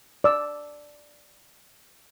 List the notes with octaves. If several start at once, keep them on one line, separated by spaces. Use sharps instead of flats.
D5 E6